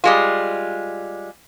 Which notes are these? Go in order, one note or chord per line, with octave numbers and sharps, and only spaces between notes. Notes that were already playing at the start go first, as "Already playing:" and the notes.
G3 G#3 F4